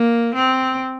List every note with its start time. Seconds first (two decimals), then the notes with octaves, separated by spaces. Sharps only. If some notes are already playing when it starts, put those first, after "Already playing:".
Already playing: A#3
0.34 C4